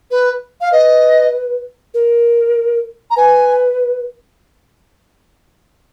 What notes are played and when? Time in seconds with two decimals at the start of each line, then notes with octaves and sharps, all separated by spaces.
0.11 B4
0.61 F5
0.72 B4 D#5
1.94 A#4
3.10 A#5
3.16 B4 G#5